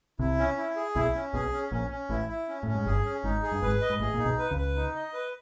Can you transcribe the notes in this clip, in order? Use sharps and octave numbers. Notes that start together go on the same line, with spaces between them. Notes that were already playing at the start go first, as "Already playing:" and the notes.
C2 C3 E4
C#4
E4
G#4
B1 B2 E4
C#4
B1 B2 G#4
C#4
A#1 A#2 C#4
C#4
A1 A2 E4
E4
C#4
A2 C#4
G#2
G1 G2 G#4
C#4
G#1 G#2 D#4
G#4
G2
G#1 G#2 B4
D#5
G#2
A1 A2 G#4
A#2 D#4
B1 B2
B4
C#2 C#3
B4
D#4
D#5
B4